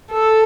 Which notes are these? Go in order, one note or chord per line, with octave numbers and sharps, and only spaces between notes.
A4